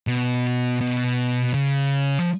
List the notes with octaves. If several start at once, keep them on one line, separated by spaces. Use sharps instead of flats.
B2
B2
C#3
F3